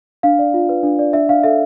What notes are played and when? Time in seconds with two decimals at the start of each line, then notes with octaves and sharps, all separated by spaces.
0.23 D4 F5
0.39 D5
0.54 F4
0.69 B4
0.83 D4
0.99 D5
1.13 D4 E5
1.29 D4 F5
1.44 A4 E5